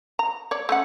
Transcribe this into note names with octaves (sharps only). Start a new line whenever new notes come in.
A#5
C#5 D5
A3 C#4 F#5